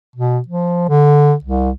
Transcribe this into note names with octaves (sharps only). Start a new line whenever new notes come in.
B2
F3
D3
C2